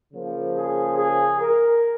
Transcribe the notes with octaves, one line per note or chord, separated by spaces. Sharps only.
C#3 F3 A#3
G#4
G#4
A#4